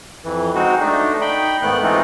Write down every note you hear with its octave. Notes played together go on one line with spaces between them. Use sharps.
F2 E3
G#3 C4 D#4 F#4
A3 D4 D#4
D#4 G5 B5
G#2 D#3 A3 B3 F#6
E3 G#3 A3 C4 D#4 F4